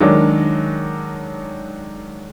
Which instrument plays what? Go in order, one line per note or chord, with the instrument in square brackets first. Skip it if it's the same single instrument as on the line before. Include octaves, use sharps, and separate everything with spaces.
[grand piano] D#3 F#3 G#3 D4